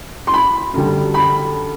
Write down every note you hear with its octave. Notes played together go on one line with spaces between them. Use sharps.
C6
B5
F#2 D3 G3
B5